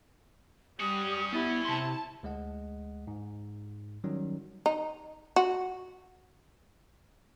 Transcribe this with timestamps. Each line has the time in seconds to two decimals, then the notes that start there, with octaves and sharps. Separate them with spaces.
0.80 G3 C#4 F#4 D#6
1.33 B3 E4
1.65 C3 A5 C6
2.23 D2 G#3 D#5 F#5
3.07 G#2
4.04 D#3 F#3 G3 C#4 D#4
4.66 D#4
5.36 F#4